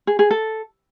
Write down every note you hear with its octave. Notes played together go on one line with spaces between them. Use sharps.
G#4
G#4
A4